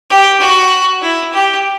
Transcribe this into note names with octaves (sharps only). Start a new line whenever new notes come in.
G4
F#4
E4
G4